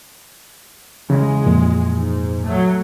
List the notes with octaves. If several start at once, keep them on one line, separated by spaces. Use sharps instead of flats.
E2 C#3 G#3
F2 A#2
G#2
F#3 A3